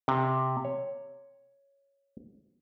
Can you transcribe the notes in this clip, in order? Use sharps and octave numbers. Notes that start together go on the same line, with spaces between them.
C3
C#5